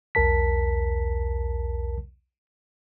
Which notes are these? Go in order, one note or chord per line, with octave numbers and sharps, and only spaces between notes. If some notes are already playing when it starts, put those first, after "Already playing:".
B1 E2 A#4 A5 B6